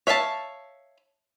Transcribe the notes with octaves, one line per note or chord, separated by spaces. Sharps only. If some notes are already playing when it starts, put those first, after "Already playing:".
C#5 E5 F5 G#5 A5